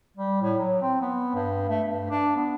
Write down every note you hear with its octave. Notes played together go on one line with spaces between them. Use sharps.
G3
A2
F#3
C4
B3
G2
A3
G2
D4
B3